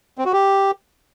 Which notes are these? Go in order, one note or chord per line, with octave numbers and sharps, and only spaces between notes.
C4
F#4
G4